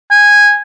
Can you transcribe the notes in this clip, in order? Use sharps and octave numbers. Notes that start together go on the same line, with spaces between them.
G#5